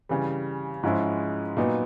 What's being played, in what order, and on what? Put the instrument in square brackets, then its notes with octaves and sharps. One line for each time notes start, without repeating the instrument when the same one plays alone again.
[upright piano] C#3 E3 G3
G#2 F3 G#3 C#4 E4
A#2 F#3 B3 D#4